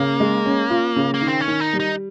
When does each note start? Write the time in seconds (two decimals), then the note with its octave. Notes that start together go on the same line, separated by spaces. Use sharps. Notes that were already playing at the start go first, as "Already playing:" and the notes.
Already playing: C#3 A#3
0.20 G#3
0.46 C#4
0.70 F4
0.96 C#3
1.14 A#3
1.21 D#3
1.28 C4
1.40 C#4
1.47 D#3
1.60 D#4
1.73 G3
1.80 D#4